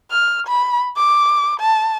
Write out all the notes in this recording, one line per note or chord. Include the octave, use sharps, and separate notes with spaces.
F6
B5
D6
A5